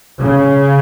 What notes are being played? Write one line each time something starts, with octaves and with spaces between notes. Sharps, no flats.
C#3